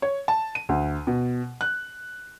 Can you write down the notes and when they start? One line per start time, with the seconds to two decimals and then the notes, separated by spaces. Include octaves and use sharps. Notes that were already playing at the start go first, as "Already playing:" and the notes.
0.02 C#5
0.28 A5
0.55 D#7
0.69 D2
1.07 B2
1.61 F#6